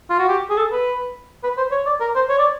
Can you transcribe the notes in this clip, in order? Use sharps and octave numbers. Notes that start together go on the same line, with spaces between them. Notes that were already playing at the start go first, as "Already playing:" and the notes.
F4
F#4
G4
G#4
A4
B4
B4
C5
C#5
D5
A#4
C5
C#5
D5